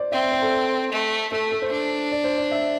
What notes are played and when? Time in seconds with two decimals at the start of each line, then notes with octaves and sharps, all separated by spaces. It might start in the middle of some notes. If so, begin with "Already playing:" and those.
Already playing: C5 D5
0.12 C4 E5
0.23 D5
0.32 C5
0.42 A4
0.92 A3
1.32 A3 A4
1.52 A4
1.62 C5
1.71 D4
2.12 D5
2.24 C5
2.38 D5
2.51 E5